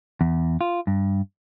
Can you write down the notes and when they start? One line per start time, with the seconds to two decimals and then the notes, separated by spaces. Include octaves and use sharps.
0.21 E2
0.61 F4
0.87 G2